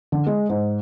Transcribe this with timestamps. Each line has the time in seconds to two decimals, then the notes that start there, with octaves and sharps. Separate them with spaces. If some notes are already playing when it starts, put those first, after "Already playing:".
0.12 D3
0.26 G#3
0.49 G#2